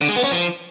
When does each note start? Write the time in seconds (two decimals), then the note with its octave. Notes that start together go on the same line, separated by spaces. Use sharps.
0.01 D3
0.09 G#3
0.16 B3
0.24 C#4
0.31 F3